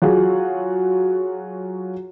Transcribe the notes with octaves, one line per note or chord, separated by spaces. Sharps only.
F#3 F4 F#4 G#4